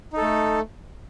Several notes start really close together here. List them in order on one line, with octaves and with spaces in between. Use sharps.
D#4 A4 A3